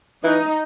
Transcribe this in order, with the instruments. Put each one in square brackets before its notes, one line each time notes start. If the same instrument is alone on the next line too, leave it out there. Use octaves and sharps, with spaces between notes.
[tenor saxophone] E3 [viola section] D#4